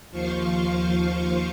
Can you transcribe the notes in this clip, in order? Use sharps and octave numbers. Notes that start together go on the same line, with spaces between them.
D#2 F3 F4 C5 F5 C#6